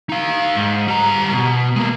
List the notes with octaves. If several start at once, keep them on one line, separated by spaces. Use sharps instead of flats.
D#4 F5
G#2
G3 A#5
B2
G#3 A#3